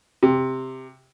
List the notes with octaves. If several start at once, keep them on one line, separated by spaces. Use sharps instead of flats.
C3